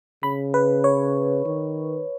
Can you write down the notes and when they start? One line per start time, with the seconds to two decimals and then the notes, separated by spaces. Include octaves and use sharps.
0.23 C#3 B5
0.54 B4
0.84 C#5
1.45 D#3